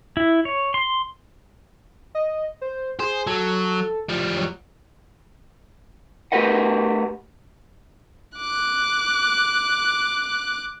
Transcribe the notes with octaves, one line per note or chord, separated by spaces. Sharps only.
E4
C#5
C6
D#5
C5
G#4 C5
F#3 A4
F3 G3
F#3
A3 G4 A#4 B4 D#5 F#5
D6 F#6